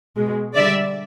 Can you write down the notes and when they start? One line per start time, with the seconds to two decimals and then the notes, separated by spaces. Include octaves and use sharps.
0.16 B2 G#3
0.55 D3 G3 D5 E5